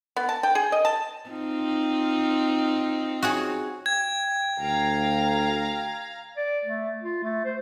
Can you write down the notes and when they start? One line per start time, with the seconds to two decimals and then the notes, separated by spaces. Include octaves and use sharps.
0.17 B3
0.29 A5
0.43 G5
0.55 G#4
0.72 D#5
0.85 A5
1.29 C4 D#4 F4
3.22 F#4 G#4 C#5
3.86 G5 G#6
4.59 D2 F5 A#5
6.37 D5
6.65 A3
7.02 F4
7.23 A3
7.45 C5